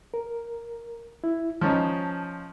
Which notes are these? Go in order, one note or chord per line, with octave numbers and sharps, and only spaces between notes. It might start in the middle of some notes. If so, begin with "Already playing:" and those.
A#4
E4
F3 C#4 D#4 A5